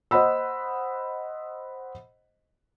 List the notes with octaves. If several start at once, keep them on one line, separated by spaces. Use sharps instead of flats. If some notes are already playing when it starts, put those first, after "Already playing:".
C5 D#5 F#5 B5 E6